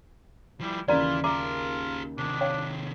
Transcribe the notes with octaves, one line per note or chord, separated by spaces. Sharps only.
F3 G3 E4
D#2 C#3 E3 F4 D5 A#5
F4 G#4 A#4 E5 A#5 D6
C3 D#3 D4
C#5 F5 G5